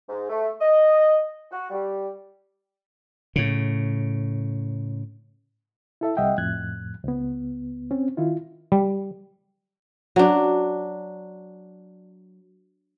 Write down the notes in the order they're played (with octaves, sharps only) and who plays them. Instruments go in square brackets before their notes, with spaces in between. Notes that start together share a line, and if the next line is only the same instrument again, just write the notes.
[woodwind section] G#2
A3
D#5
F#4
G3
[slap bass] A2 C#3
[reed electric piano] E4 A4 E5
C2 G3 D#5 E5 F#5 G5
F2 A2 F#6 G#6
C#2 B3
C4 C#4
D#3 E4 F4
[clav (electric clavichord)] G3
[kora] F#3 D4